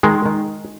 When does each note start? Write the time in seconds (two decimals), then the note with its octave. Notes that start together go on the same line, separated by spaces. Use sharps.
0.03 D#3 G#3
0.26 D#3